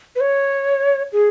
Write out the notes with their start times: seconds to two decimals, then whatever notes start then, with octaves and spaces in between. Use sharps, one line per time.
0.16 B4
0.21 C#5
1.12 G#4